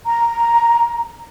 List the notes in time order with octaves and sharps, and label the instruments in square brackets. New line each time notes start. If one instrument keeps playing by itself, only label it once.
[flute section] A#5